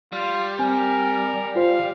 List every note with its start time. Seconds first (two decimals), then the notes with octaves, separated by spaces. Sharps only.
0.13 G3 F4
0.59 C4 A#4 G#5
1.56 F4 C5 F5